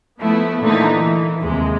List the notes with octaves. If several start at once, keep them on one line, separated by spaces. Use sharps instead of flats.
F3 A3 B3 E4
A#2 D3 E3 A3 D#4
E3
D#2 C3 G#3